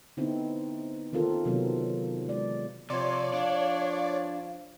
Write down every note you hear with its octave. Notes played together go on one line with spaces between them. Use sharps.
D3 B3 C4 D#4 E4
D#3 A#3 C4 F4 A4 A#4
C3 D#3 F#3 B3
G#3 D5
C3 F3 C#5 D5 C6
D4 F5